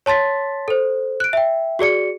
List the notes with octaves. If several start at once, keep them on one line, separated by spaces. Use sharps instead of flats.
C#5 A5 C6 A6 B6
A4 C5
F#6 D7
E5 G5
F#4 G#4 D5 C#7